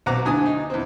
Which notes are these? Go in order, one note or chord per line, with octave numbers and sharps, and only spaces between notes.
B1 C4 F#5 A#5 D6
D2 D4 G#5 D#6
D#4
E2 C4